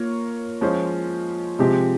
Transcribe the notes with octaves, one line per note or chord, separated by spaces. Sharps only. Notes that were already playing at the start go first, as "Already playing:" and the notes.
Already playing: A#3 F4 A#4 C#5
F3 G#3 C#4 F4 C5
C3 F3 G#3 C4 G4